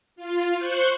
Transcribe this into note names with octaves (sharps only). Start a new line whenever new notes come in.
F4
C5 C#6 F#6 G6